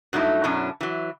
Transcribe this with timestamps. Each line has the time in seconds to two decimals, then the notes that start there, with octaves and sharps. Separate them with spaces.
0.13 G2 F#3 A3 D#4 E4
0.44 F#2 B2 F#3 C#4 D4 E4
0.81 E3 F#3